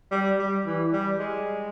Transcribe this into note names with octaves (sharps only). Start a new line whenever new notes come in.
G3
G3
E3
G3
G#3